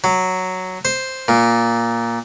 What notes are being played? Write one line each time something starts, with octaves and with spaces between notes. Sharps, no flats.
F#3
C5
A#2